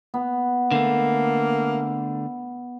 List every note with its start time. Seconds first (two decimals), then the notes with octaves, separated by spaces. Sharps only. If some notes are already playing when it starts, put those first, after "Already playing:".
0.14 B3
0.71 D3 A3 A#3